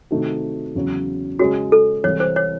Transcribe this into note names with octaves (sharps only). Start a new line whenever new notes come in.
C3 D#3 A3 D#4 F#4
E2 C#3 F#3
C#3 G#3 C#4 F#4 G#4 C#5
A4
C2 C3 E3 C#5
C5
C#5